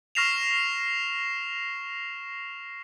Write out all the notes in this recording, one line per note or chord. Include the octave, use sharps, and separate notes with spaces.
C#6 F6 A#6 C7 E7 F7